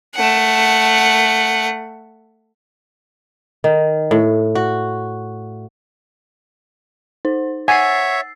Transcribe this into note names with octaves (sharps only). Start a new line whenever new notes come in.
A3 F#5
D#3
A2
F#4
D#4 C5
C#5 E5 F#5 G#5 E6 A6 C7